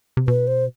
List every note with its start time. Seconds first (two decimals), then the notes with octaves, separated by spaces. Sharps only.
0.17 C3
0.28 B2 B4
0.47 C5